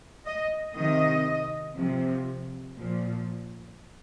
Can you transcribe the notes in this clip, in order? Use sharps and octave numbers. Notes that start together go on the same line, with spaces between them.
D#5
C3 D#3 D#5
C3 F3
A#2 F3